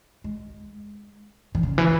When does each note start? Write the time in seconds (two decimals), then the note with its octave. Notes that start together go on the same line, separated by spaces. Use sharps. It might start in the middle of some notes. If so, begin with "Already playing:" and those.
0.24 G#3
1.55 D#3
1.63 C#3
1.78 E3